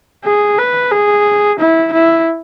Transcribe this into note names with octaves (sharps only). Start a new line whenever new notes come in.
G#4
B4
G#4
E4
E4